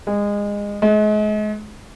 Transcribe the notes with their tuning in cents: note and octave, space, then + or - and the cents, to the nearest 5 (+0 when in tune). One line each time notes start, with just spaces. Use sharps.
G#3 -25
G#3 +35